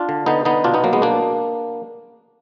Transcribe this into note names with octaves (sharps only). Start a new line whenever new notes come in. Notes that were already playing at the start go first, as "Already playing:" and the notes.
Already playing: D4 F4
D3
D3 B3 D#4
D3 B3 D#4
B2 D4 F4
B3 D#4
F#3 A#3
G#3 B3
B2 A#3 D4